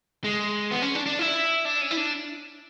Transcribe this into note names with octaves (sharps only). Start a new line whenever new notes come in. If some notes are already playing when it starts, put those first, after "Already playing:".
G#3
B3
C#4
D4
D4
E4
D4
C#4
E4
D4